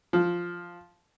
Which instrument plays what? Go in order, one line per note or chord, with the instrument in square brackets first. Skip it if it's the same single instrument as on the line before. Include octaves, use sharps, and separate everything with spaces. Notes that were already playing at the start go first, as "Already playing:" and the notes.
[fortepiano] F3